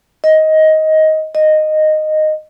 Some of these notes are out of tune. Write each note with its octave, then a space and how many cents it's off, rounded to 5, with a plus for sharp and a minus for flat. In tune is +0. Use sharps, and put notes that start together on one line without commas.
D#5 +15
D#5 -10